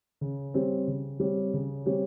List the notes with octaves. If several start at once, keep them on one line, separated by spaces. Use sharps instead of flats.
C#3
G3 C4 G4 C#5
C#3
G3 C4 G4 C#5
C#3
G3 C4 G4 C#5